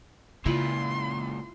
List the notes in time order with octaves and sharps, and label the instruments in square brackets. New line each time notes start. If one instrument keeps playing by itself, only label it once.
[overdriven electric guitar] C#2 A#2 [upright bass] C#3 [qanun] E4 F4 B4 [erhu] C6